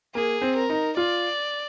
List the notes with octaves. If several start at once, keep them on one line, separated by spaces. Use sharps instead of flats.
A#3 G#4
C4
A#4
D#4
F4 D5